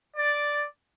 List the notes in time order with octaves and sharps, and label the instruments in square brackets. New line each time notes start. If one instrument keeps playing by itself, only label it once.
[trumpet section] D5